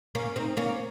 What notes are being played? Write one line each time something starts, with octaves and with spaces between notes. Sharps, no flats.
A#3 C#4
C4 D#4
A#3 C#4